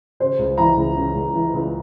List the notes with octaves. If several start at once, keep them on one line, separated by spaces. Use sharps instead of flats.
C#3 C5
C#2
E3 A#5
C#2
C#3
C#2
E3
C#2